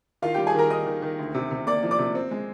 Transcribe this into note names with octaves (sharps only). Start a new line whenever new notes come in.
D#3 F4 F5
G3 G4 G5
G#4 G#5
D#3 A#4 A#5
D#3 D#5 D#6
D#3
D#3
D2
C3
C3
A#3 D5 D6
F3
D5 D6
C3
C4
G#3